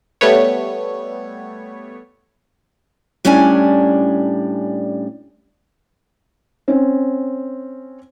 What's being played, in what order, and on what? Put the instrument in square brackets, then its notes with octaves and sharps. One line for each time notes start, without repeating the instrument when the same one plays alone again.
[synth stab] G3 A3 B3 C#5
[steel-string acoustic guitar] A2 G3 C#4 D4 D5 G#5
[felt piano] C4 C#4